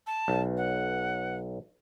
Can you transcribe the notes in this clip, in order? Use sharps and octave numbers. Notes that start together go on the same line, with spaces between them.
A5
B1
F#5